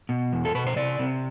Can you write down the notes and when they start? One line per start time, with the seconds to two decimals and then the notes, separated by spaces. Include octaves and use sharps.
0.09 B2
0.33 E2
0.45 A4
0.55 B2 B4
0.67 C5
0.76 C3 D5
0.99 C3